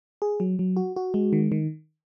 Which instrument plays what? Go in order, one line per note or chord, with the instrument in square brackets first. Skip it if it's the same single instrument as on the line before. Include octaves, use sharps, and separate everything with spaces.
[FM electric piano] G#4
F#3
F#3
F#4
F#4
G#3
D#3
D#3